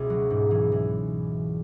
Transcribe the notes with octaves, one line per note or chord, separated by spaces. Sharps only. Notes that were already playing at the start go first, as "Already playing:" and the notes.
Already playing: C#2 B2 E4
F#3
G#2
E3
E3